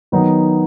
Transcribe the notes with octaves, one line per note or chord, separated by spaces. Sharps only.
D#3 F#3 B3 D#4